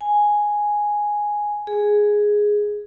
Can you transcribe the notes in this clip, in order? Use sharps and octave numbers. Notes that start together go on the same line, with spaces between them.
G#5
G#4